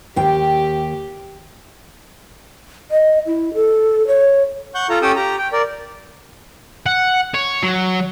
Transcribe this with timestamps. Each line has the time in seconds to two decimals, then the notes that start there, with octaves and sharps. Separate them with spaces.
0.16 D#2 G4 G5
2.91 D#5
3.26 E4
3.54 A4
4.07 C#5
4.75 F#5 C#6 G6
4.90 F4 A4 A#5
5.02 C#4 G4 A4 G5 D#6 E6
5.16 G4 A#5
5.38 G5
5.53 A#4 D5
6.86 F#5
7.34 C#5
7.63 F#3